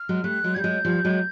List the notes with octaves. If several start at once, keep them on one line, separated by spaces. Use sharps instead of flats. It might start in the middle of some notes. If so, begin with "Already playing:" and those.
Already playing: F6
F#3 G#3
G3 A3 F#6
F#3 G#3
G3 G#6
F#3 G#3 G6
F3 G3
F#3 G#3